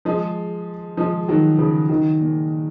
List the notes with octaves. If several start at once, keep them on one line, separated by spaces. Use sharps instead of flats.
F3 G#3
F3 G#3
D#3 F#3
C#3 F3
D#3 F#3
A#2